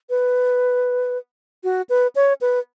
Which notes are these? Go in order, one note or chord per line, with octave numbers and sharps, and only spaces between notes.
B4
F#4
B4
C#5
B4